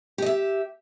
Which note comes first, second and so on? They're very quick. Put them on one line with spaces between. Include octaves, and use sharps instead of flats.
G4 D#5 E5